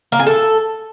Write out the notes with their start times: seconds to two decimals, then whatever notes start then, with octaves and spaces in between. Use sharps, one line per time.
0.12 A#3
0.19 G#4
0.27 A4